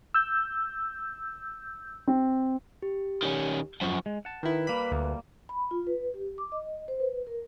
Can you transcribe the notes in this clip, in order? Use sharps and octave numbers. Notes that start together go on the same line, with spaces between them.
E6 G6
C4
G4
D#3 C#4
F#2 F3 C5 C#6
G#3
F#5 A5
D#3 E4 B4
G3 A#3 B5
D2
B5
F4
B4
G4
D6
D#5
C5
B4
A#4